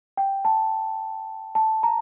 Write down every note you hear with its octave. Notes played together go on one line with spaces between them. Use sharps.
G5
A5
A5
A#5